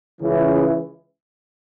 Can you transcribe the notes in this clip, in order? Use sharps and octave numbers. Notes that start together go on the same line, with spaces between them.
C#2 C#3 E3